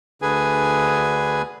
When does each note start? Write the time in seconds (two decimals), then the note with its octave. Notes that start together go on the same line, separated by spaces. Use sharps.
0.22 D2 D3 G#4 B4 G#5